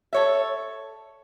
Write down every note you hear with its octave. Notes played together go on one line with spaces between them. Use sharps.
A4 C#5 E5